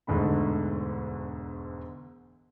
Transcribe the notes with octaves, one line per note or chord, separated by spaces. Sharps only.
E1 D2 G#2 D3 A3 B5